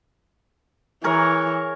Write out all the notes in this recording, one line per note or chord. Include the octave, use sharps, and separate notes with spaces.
E3 G#4 A#4 C#5